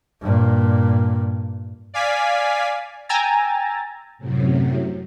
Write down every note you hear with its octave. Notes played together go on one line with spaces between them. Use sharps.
G2 A#2
D5 F5 G#5 B6
G5 G#5 A#5 E6 A6
F#2 A2 C3 F#3